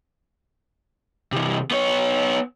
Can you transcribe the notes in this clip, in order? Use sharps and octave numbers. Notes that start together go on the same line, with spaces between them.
C3 E3
B3 C#5